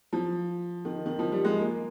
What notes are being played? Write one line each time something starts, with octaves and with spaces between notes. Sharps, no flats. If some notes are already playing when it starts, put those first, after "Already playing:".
F3
D#3
D#3
F3
G3
G#3
A#3